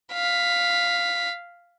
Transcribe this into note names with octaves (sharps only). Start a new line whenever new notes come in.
F5 B6